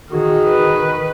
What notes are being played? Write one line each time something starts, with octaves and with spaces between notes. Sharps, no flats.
D#3 F#4 G#4
B4